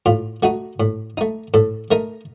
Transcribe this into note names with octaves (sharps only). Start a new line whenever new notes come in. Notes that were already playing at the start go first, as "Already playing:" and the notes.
A2 F4
A3 D#4 F#4
A2
A3 D#4
A2 A4
A3 D#4 A#4